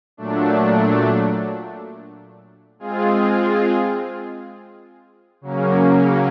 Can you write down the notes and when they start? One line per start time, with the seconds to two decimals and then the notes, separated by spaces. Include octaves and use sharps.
0.17 A#2 F#3 A3 D4
2.79 G#3 C4 F4 G#4
5.41 C#3 F#3 A#3 C#4